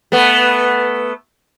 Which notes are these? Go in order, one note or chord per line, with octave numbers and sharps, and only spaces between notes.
A3 B3